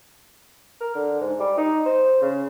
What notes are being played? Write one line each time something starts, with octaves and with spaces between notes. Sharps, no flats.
A#4
D3
G#2
G3
D#4
C5
C#3